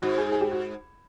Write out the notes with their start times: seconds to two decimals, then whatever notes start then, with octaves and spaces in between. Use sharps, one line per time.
0.02 G#2 F#4
0.18 G#4
0.32 G#4
0.41 G4
0.51 F#4